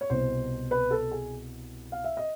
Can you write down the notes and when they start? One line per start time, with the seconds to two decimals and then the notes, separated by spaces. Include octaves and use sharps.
0.01 C#5
0.10 C2 B2 C5
0.71 B4
0.91 A4
1.11 G#4
1.92 F5
2.04 E5
2.17 D#5